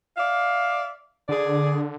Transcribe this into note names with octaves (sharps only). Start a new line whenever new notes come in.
D5 E5 F5
D3 G#4 D5